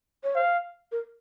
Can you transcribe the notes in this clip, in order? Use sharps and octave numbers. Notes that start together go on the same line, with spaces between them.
C#5
C5 F5
A#4